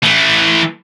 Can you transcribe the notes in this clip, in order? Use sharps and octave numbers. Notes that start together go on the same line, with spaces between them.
E3 A3